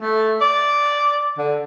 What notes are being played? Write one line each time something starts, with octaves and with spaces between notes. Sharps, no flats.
A3
D5
D3